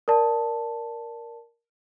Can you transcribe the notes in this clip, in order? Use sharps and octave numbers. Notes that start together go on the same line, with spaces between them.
A#4 D5 A5